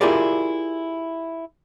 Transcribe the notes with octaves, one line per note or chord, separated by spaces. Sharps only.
E4 F4 G4 G#4 A#4 D5